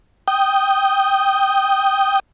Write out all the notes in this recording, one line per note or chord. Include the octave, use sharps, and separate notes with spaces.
G5 D#6